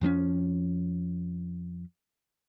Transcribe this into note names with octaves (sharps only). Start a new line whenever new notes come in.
F2 F3 C4 C#4